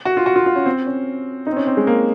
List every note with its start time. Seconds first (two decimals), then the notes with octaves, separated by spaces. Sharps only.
0.05 F#4
0.17 F4
0.26 F#4
0.36 F4
0.46 F4
0.55 C#4
0.66 C4
0.86 C#4
1.47 D#4
1.52 C4
1.57 C#4
1.67 C4
1.77 G#3
1.87 A#3